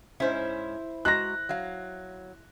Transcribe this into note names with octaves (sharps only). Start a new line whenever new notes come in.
G#2 C#4 E4 C5
G#3 F#4 A#5 F#6 A#6
F#3 F5